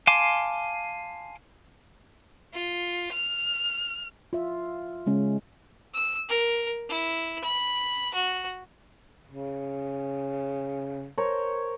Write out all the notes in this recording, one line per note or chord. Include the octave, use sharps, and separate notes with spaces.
F5 G#5 A5 C6 D6
F4
F6
F4 E5
C#3 G#3 C#4
E6
A#4
E4
B5
F#4
C#3
A#4 C5 C#5